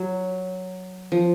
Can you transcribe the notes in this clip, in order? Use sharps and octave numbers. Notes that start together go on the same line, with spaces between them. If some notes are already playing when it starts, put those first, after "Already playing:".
Already playing: F#3
F3